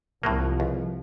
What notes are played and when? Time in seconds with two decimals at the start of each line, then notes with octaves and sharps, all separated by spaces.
0.23 C2 A2 F3 F#3 A#3
0.60 C#2